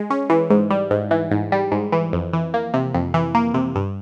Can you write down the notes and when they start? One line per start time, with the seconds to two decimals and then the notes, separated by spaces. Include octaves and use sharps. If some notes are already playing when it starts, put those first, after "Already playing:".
Already playing: G#3
0.10 C#4
0.30 E3
0.50 G#2
0.70 G3
0.91 G#2
1.11 E3
1.31 G#2
1.52 G3
1.71 G#2
1.92 E3
2.13 F2
2.33 E3
2.54 A#3
2.74 C3
2.94 F2
3.14 E3
3.35 A#3
3.54 C3
3.75 G2